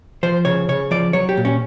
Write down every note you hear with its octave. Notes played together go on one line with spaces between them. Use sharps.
F3 C5
C#3 C#5
C#3 C#5
F3 D5
F#3 C#5
G4
A#2
C#4